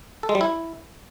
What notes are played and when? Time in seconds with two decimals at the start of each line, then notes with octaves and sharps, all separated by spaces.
0.23 A4
0.29 G#3
0.35 G3
0.41 E4